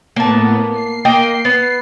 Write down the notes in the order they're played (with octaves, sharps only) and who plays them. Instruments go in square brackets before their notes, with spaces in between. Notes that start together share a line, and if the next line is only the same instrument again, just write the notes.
[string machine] A2 B3 [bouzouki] A#3 A5
[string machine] C7
[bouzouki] A#3 D#5 G5
B3